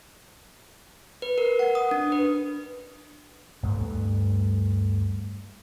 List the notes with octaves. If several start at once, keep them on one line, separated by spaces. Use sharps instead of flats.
B4
A#4
F#5
D#6
D4
B4
D2 G2 A3 B3